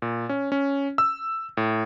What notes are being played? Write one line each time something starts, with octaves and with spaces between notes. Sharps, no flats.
A#2
C#4
C#4
E6
A2